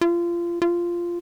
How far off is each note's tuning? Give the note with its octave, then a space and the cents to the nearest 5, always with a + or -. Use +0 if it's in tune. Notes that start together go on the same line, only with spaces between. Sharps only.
F4 -25
F4 -10